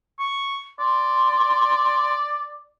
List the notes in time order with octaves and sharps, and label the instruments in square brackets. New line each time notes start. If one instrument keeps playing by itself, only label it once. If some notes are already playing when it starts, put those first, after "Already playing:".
[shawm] C#6
[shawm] D5 [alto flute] C6